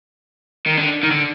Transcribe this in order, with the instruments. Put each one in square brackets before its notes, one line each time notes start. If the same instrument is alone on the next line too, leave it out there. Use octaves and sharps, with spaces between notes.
[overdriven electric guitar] D#3
D3
D#3
D3